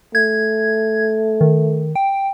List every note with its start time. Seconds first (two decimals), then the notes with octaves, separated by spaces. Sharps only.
0.15 A3 G#6
1.41 D#3
1.95 G5